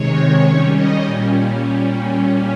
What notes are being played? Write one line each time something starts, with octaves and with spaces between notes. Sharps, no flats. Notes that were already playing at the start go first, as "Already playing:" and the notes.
Already playing: C3 D#3 G#3 C#5
D#3 G3 C#4 C#5
D#5
A#2 G3 C#4